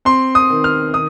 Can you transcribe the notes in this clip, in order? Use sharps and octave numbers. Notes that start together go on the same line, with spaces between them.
C4 C6
D#6
D#3
F6
D#3 D#6